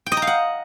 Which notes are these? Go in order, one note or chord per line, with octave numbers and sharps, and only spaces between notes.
G5
D#5
A#5
F5
F#5